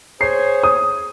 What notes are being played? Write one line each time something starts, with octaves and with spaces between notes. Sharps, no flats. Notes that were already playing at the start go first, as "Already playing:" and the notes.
G#4 C5 C#5 C7
D#6